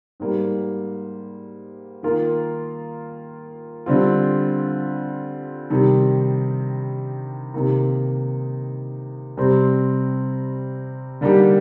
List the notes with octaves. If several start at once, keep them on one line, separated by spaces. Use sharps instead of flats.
G#2 G3 A#3
D#3 A#3 F4 A#4
D3 G3 C4 F4
C3 D#3 G3
C3 D#3 A#3 D#4
C3 G3 C4
D3 G3 A#3 D#4 G4